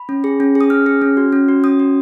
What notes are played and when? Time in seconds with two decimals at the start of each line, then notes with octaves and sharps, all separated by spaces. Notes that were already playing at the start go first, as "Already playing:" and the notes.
Already playing: B5
0.09 C#4
0.24 G#4
0.40 C#4
0.55 G#4
0.61 D#6
0.70 C#4 F6
0.86 G#4
1.02 C#4
1.17 F#4
1.33 C#4
1.48 F#4
1.64 C#4 D#6
1.79 F#4